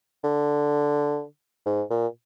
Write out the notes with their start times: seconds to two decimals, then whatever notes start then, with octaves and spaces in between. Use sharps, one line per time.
0.24 D3
1.66 G#2
1.90 A#2